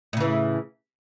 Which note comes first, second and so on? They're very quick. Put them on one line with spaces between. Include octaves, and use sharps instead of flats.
A2 C#3 E3